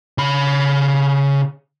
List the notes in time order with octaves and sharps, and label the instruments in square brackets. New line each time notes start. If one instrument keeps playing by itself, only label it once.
[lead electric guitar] C#3 B5